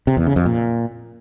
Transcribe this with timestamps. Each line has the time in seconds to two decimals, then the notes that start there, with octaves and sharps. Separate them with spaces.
0.07 C3
0.17 E2
0.26 C#3
0.36 F2
0.46 A#2